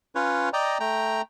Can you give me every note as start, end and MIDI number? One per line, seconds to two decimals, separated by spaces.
0.15 0.49 61
0.15 0.49 65
0.15 0.49 71
0.15 0.49 73
0.53 0.78 74
0.53 0.78 75
0.53 0.78 79
0.53 0.78 82
0.80 1.22 57
0.80 1.22 79
0.80 1.22 82